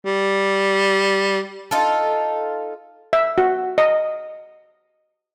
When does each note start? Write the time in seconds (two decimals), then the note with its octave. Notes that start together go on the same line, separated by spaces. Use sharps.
0.06 G3
1.71 D#4 F4 A4
3.13 E5
3.38 F#4
3.78 D#5